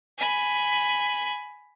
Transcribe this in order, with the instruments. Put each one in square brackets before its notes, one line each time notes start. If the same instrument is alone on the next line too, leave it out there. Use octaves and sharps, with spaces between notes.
[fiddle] G#5 B5